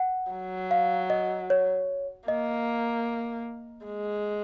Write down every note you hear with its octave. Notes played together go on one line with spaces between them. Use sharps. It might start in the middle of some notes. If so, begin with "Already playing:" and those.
Already playing: F#5
F#3
F5
D#5
C#5
A#3 D#5
G#3